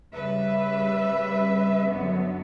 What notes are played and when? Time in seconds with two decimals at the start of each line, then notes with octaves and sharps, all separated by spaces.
0.12 C#3 G3 B4 E5
1.89 F#2 D3 F#3 B3